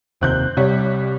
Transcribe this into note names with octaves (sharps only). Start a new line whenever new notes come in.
F1 D#2 C3 C4 F#6 G6
C2 C3 G3 C#5